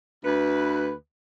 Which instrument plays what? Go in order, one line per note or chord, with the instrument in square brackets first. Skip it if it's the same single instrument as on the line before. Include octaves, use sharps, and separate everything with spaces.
[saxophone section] D2 B4